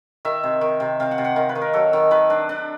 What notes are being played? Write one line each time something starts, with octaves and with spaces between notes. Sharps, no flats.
D#3 E5
C3
D#3
C3
C3 F5
F#5
C3
F#5
D#3 F5
B4
D#3
A#4
F#3 A4
D#3
D#3 B4
D4
D4